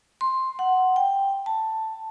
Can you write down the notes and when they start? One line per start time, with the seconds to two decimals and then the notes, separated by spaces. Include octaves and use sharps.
0.21 C6
0.59 F#5
0.96 G5
1.46 A5